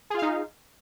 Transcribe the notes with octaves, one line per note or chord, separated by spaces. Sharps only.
D#4 F4 G#4 F5